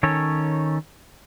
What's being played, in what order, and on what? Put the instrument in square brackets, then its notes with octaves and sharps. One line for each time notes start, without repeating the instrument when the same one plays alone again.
[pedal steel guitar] D#3 C#4 A4 C#5